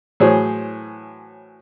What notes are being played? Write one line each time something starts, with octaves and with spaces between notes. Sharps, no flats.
A2 E3 F#3 G#4 C5 C#5